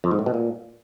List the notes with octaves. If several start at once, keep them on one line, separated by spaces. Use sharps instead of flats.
F2
G#2
A2
B2
A#2